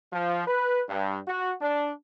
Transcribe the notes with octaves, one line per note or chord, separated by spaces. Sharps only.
F3
B4
G2
F#4
D4